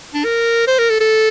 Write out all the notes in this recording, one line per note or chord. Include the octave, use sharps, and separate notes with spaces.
D4
A#4
C5
A#4
A4
A4